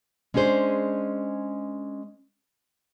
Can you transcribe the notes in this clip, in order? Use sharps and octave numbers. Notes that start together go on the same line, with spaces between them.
G#3 C#4 D4 G#4 C5